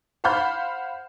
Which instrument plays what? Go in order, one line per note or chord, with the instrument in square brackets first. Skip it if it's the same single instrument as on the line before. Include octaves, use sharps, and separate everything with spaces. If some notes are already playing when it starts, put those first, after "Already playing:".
[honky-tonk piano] C5 F5 F#5 B5 F6 G6